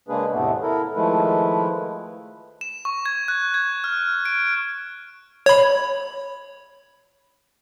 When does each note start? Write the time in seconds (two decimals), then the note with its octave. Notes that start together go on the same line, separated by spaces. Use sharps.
0.08 C#3 G#3 A#3 D4 G#4 B4
0.32 E2 A2 C3 A3 B3
0.62 E4 A4 A#4
0.95 D#3 F3 G#3 A3 E4 B4
2.61 E7
2.85 C#6
3.06 G#6
3.28 F#6
3.54 G#6
3.84 F6
4.25 D7
5.46 C#5 B5